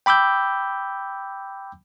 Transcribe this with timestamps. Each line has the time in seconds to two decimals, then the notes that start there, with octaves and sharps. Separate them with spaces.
0.06 G5 B5 D6 E6 G6